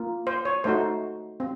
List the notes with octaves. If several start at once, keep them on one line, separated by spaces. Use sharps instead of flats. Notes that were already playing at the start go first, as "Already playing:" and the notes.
Already playing: A#3 F4
C5
C#5
A3 D#4 F#4 C5
C4